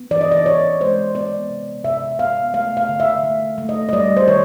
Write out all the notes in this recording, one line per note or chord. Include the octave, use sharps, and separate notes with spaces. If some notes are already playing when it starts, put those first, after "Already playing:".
Already playing: B3
E3 D5
D#5
D5
E3 C#5
G#3 C5
B3 D5
C3
C3 E5
B3 F5
A3 F5
F5
D3
E5
A3
A3
D#5
D#5
G3 D5
C5
D#3 C#5